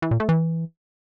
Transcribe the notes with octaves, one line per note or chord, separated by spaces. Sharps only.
E3
A#2
A3
E3